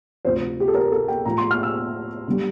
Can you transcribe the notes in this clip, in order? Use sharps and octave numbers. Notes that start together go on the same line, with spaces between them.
D2 C3 F3 C5
G4
A4
A#4
A4
G5
A2 F3 A#5
C6
F6
E6
D3 G3